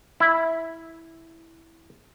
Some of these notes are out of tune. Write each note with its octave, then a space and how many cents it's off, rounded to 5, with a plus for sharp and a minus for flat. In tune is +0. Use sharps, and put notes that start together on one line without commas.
E4 -5